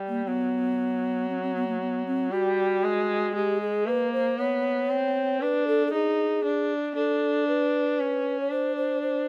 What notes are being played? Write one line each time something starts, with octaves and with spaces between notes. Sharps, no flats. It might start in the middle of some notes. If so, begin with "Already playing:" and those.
Already playing: G3
A#3
F#3 B3
C4
C4
B3
A#3
B3
C4
G3 F#4
G#3
G#3 G4
G#4
A#3 B4
C5
B3 C#5
C4
D4 B4
A4
A4
D#4 G#4
D4
D4 A4
B4
C#4
C#5
D4 C5
C5
C5